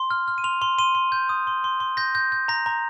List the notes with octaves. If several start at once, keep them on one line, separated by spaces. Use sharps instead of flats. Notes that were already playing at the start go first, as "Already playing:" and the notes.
Already playing: C6
F6
F6
D#7
C6 F7
C6 F7
C6 D#7
C6
G6
D#6
C6
C6
C6
G6 A#6
G6 A#6
G6
A#5 A#6
A#5